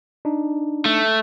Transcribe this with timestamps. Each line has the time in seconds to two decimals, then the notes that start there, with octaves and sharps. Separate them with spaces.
0.25 D4 D#4
0.86 A3